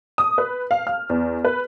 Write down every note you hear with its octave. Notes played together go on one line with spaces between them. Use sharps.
D#6
B4
F5
F6
E2
B4